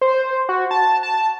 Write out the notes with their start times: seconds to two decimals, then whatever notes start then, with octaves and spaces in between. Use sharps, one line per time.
0.01 C5
0.49 F#4
0.71 A5
1.03 A5